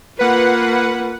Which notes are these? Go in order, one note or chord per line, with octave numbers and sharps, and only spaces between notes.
A#3 F4 B4 F#5